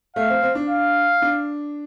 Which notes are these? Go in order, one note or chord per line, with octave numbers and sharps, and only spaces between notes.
A3 F5
C4
C4
D4
F5
D4